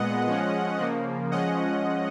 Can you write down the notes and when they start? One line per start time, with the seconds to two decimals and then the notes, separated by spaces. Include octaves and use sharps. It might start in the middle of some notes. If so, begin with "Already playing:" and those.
Already playing: A#2 G#3 B3 D#5 F#5
0.27 F3 G#3 C#4
0.79 C#3 F3 A#3
1.31 F3 G#3 C#4 D#5 F#5